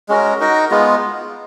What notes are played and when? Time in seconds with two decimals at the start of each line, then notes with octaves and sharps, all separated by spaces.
0.09 G#3 C#4 F#4 A#4
0.40 D#4 F#4 A#4
0.71 G#3 B3 F4